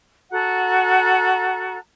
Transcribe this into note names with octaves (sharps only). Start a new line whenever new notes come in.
F#4 A4 F#5 A#5